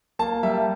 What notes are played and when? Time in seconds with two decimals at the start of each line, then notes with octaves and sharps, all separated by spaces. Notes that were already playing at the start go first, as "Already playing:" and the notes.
0.19 A#3 A5
0.43 G3 E5